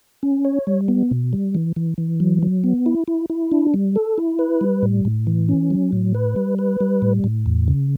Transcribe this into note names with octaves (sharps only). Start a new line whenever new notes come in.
C#4
C#5
G3
B3
B2
G3
E3
E3
E3
F#3
F#3
B3
E4
E4
E4
D4
G3
A4
E4
B4
G3
A2
A2
E3
C#4
F#3
A2
B4
G3
B4
G3
A2
A2
E2
C#3